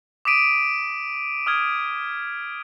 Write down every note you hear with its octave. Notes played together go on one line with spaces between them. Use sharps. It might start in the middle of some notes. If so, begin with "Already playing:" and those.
D6 D#6 B6 D7 D#7
D#6 F6 G#6